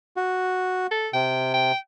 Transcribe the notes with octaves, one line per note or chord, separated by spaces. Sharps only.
F#4
A4
C3 G5
G5